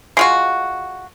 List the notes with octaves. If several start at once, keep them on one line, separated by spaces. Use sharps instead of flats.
G#3 F4 F#4